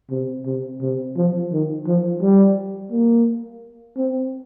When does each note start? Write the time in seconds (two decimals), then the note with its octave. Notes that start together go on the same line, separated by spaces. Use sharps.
0.11 C3
0.47 C3
0.82 C3
1.17 F3
1.52 D#3
1.87 F3
2.22 G3
2.91 A#3
3.97 C4